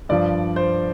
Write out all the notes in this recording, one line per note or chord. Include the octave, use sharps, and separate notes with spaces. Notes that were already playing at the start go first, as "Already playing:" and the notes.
G2 F3 D5
C5